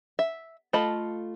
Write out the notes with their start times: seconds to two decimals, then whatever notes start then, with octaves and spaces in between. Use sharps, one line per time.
0.19 E5
0.73 A3 F4 D#5 A5 B5